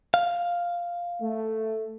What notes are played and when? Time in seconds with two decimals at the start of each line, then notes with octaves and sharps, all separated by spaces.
0.14 F5
1.20 A3